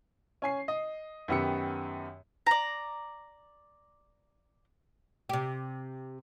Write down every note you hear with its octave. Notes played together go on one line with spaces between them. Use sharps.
C#4 G#5 C7
D#5
F#2 D#3 B3 G4 E6 C#7
D5 A#5
C3 G4